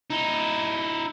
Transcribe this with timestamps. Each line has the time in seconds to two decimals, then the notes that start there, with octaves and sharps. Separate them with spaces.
0.10 D#4 E4